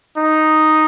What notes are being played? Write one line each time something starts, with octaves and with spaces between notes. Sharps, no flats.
D#4